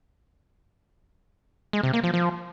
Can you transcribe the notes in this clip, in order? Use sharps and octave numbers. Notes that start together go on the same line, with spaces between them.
G#3
C3
A#3
F3
F3